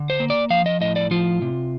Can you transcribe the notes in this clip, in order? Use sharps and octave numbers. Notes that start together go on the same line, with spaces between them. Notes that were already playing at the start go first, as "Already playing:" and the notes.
Already playing: D3
C5
A#3
D5
F3 F5
D#5
A2 D#5
D5
F3 F4
C3